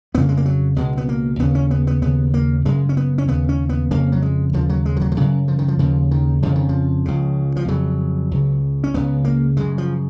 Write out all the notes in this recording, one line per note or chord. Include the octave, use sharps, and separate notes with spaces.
F2 C#3 A#3 B3
G#3
A#3
F#3
C#2 B2 G#3
B3
A#3
D#2 C#3 B3
C#4
B3
B3
D#2 C#3 B3
A#3
F#2 C#3 G#3
C#4
B3
C#4
D#2 C#3 B3
C#4
B3
F2 C#3 A#3
F#3
G#3
D#2 C#3 F3
F#3
G#3
F3
F#3
F3
F#2 C#3 F#3
F3
D#3
F3
D#2 C#3 F3
D#3
F2 C#3 F3
D#3
F3
C#2 C#3
F3
F2 C#3 F#3
C#2 C#3
C#4
C#2 C#3 B3
A#3
F#2 C#3 G#3
F3